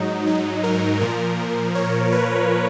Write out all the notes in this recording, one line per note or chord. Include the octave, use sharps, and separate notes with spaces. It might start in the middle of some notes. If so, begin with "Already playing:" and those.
Already playing: G#2 F#3 D#4
D#4
A#4
A#2 F3 A#4
C#5
B4